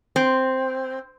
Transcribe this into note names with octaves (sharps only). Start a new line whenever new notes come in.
C4